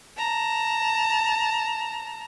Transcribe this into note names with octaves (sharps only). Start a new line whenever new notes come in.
A5 A#5